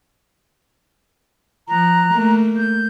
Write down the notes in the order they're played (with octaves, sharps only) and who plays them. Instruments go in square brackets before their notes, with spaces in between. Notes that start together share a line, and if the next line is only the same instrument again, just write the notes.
[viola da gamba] F3 [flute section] A#5 F#6
[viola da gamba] A3 A#3
[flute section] G6